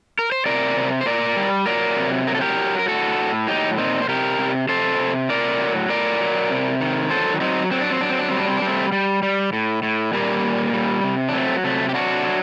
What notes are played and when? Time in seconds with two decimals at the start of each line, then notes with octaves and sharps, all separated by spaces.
0.19 A#4
0.32 C5
0.46 C3 A#4 D5
0.76 C3
1.01 C5
1.06 A#2 A#4 D5
1.36 G3
1.66 F#3 A#4 D5
1.97 C3
2.27 F#3 A#4
2.35 A4
2.41 G4 A#4
2.57 F#3
2.79 A#4
2.87 A2 F#4 A4
3.18 A2
3.48 F#3 D#4 G4
3.77 A#2 C4 D#4
4.02 C5
4.08 C3 G4 A#4
4.39 C3
4.69 C3 A4 C5
4.99 C3
5.29 A2 A#4 D5
5.60 F#3
5.89 A2 A#4 D5
6.20 F#3
6.51 C3
6.80 D#3
7.10 F#3 A4 C5
7.41 F#3 C4 D#4
7.71 F#3 C4
7.81 D4
7.91 C4
8.01 F#3 D4
8.10 C4
8.19 D4
8.28 G3 C4
8.38 D4
8.48 C4
8.57 D4
8.62 G3
8.67 A3 C4
8.92 G3
9.23 G3
9.53 A2
9.83 A2
10.13 A#2 G3 A#3
10.44 A#2
10.73 G3
11.04 C3
11.29 D4
11.33 F#3 A3 C4
11.64 C3 A3
11.89 G4
11.94 F#3 D4 F#4
12.24 F#3